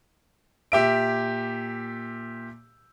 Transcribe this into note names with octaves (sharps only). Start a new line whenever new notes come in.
A#2 G4 E5 D7